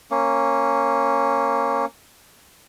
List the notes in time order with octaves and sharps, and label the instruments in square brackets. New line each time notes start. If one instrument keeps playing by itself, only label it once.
[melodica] A#3 C#4